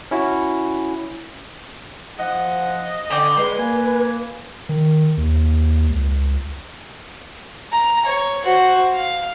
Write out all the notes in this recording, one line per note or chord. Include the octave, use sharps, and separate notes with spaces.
C#4 E4 F#4
F3 D#5 F#5
D3 C#4 D5 G5
G#3 B4 C6
A#3 G#5
D#3
D#2
C#2
A#5
C#5
F#4 C5
F5